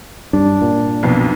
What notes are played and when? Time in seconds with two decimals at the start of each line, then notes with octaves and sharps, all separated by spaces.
0.33 G2 D4
0.62 A#2
1.03 B1 F2 B3